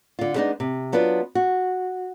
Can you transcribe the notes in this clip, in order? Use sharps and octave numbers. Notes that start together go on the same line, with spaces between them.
D3 F4
G3 G#3 A#3 B3 D4 D#4
C3
F#3 B3 D4 F4 B4
F#4